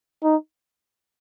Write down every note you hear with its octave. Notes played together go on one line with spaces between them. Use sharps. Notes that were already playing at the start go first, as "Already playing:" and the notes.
D#4